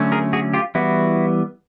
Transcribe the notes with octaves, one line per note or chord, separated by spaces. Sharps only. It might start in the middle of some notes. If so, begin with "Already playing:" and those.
Already playing: D3 F#3 A3 C#4
G#4 A#4
F#4 G#4
F4 G4
E3 G3 B3 E4 F#4